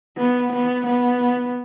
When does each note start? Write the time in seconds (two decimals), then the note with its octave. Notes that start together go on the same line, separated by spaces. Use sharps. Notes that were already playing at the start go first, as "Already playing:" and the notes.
0.17 B3
0.52 B3
0.86 B3